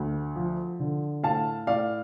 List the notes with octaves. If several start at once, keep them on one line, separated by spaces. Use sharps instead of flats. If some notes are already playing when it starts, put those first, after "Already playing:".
Already playing: D2
F3
D3
A2 F5 A5
A2 D5 F5